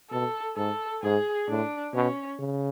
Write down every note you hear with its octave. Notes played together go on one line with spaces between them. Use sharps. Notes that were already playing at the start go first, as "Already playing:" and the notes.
B2 A4
G#2 A4
G#2 G#4
A2 D4
B2 C#4
C#3